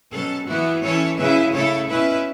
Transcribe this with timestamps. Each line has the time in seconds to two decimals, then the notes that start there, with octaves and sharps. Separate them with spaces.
0.11 B2 F#3 C#4 A4
0.47 E3 B3 E4 F#4
0.82 E3 C#4 E4 A4 C#5
1.17 C#3 F#3 C#4 E4 B4 E5
1.53 C#3 A3 E4 A4 C#5
1.88 B2 A3 C#4 E4 B4 E5